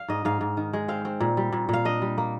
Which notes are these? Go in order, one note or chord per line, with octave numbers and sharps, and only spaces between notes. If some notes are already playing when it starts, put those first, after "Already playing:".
Already playing: F5
G#2 D#5
G#2 F5
G#2
D#3
G#3
C4 F5
C4
A#2
G3
A#2
A#2 F5
D4 D#5
G3
A#3